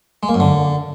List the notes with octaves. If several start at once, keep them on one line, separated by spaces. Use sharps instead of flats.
G#3
A#3
F#2
D3